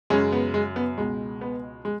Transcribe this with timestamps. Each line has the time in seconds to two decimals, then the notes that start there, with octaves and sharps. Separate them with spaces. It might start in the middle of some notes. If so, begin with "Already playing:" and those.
0.10 F#2 C#3 G#3 C#4
0.32 B3
0.54 G#3
0.76 B3
0.98 C#2 B2 G#3
1.41 B3
1.85 G#3